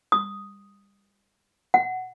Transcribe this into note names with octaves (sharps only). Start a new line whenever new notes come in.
D#6
F#5